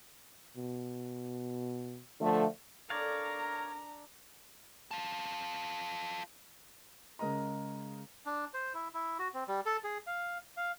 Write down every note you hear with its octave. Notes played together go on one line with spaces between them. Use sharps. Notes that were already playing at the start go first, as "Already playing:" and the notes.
B2
D3 F3 A3
D4 A4 A#4 C#5 D5 F5 A#5
F4 A4
C#3 G#3 A#4 D#5 A#5
D4
C5
E4
E4
F#4
C4
G3
A4
G#4
F5
F5